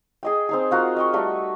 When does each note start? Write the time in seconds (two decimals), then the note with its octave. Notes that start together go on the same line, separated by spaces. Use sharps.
0.23 G#4 D#5 G5
0.49 C4 D#4 G#4
0.71 F4 F#4 A#4
0.96 D#5 G5 C#6
1.13 G3 A3 F#4